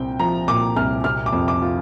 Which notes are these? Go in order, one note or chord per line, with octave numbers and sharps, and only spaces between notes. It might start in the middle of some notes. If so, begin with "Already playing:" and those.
Already playing: C2 A#2 C4 G5
F3 A#5
A#2 D6
C2 F6
C3 F6
D6
F2
D6
F4